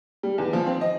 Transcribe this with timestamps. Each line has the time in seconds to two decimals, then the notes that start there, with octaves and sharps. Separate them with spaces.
0.23 G3
0.38 E2
0.53 F3
0.66 C4
0.81 D#5